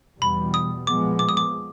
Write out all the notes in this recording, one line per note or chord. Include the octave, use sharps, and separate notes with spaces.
E2 B2 G3 B5
D#6
A#2 F3 G#3 B3 D6
D6
D#6
D6